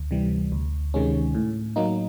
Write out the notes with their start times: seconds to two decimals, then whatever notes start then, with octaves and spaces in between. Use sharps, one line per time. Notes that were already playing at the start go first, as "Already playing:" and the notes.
Already playing: D2
0.11 C3 E3 G3
0.52 D2
0.94 C3 D#3 G#3 C#4
1.35 A2
1.76 F#3 A#3 D#4